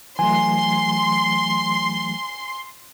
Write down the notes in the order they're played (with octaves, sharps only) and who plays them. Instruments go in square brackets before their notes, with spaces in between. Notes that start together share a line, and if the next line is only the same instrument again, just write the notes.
[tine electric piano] E3 F#3 A3 [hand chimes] G#5 [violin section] C6